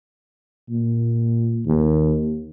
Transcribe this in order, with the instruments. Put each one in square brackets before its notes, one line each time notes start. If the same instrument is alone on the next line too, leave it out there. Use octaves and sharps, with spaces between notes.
[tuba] A#2
D#2